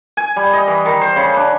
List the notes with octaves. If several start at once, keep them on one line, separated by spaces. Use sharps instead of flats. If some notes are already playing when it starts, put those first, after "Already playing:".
G#5
G3
D#5
E3
D#3
C5
C#3
D4